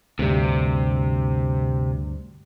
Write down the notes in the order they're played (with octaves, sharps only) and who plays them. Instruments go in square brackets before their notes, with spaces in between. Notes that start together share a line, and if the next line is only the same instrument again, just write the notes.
[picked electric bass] D2 G2 [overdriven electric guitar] C3